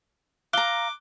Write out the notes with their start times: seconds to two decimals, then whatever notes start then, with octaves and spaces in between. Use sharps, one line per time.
0.53 F5 A#5 D6 F#6 G7